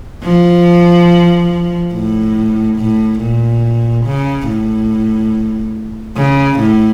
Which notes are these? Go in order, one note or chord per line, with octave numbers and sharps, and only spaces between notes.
F3
A2
A2
A#2
C#3
A2
C#3
A2